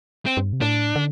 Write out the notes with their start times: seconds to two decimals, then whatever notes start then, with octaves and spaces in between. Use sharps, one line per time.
0.26 C4
0.37 G2
0.53 C3
0.61 A2 D4
0.96 D3